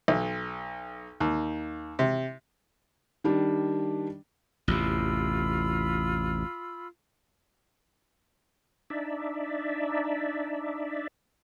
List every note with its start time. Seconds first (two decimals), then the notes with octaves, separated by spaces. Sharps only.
0.08 B1
1.20 D#2
1.99 C3
3.24 D#3 G3 D4
4.68 A1 E2 C3 F4 B5 E6
8.90 D4 D#4 D5 E5